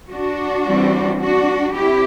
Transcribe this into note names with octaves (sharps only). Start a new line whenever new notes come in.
D4 F#4
E3 G3 C4
D4 F#4
C4 E4 G4